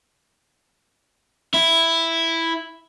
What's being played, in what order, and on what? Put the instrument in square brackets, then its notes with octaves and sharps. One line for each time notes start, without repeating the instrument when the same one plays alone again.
[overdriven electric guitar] E4